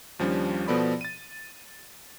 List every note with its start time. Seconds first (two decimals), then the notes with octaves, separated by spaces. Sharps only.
0.19 D#2 F3 G3 C#4 D4
0.68 B2 F3 B3 A4 D5 B5
1.01 A6 D#7